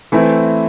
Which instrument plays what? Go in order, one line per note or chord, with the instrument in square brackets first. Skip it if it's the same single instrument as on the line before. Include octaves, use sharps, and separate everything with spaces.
[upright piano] E3 A3 C4 E4